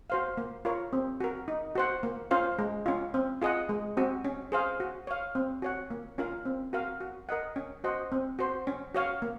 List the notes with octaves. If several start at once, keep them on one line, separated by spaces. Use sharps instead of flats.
F#4 C5 F5
A#3
F4 A#4 C#5
C4
F#4 A#4
D#4
F#4 C5 F#5
A#3
C#4 F4 C5 F5
G#3
C#4 F4
C4
F4 G#4 D#5 F#5
G#3
C4 F#4
C#4
G#4 C5 F5
F#4
C#5 F5
C4
F#4 C#5 F#5
A#3
C#4 F4 A#4 F5
C4
F#4 A#4 F5
F#4
A#4 D#5 F#5
C#4
F#4 C5 D#5 F#5
C4
F#4 C5
C#4
F#4 C#5 F5
A#3